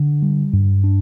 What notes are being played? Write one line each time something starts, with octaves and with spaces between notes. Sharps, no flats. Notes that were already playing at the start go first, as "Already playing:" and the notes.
Already playing: D3
G3
G2
D4